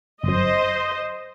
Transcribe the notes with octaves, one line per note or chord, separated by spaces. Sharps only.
G1 F#2 C5 D#5